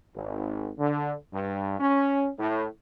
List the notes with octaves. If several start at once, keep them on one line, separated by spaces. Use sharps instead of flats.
G#1
D3
G2
C#4
A2